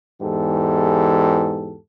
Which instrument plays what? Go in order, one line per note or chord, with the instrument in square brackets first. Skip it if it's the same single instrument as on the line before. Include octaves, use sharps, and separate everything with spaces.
[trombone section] E2 G#2 E3 G4 A4